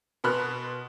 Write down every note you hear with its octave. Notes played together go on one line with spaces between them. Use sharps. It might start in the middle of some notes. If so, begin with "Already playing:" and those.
B2 B3 B5 C6 F6 F#6